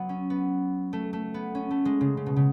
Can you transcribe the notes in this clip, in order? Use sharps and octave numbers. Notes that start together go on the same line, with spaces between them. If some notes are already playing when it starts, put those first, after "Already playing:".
Already playing: F#3 B3
C#4
B3
A3
A3
B3
C#4
A3
G#3
C#3
C#3
B2
C#3